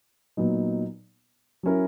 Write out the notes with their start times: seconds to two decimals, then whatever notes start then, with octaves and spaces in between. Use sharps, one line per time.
0.37 A#2 F#3 B3 D#4
1.63 F#3 C#4 E4 A#4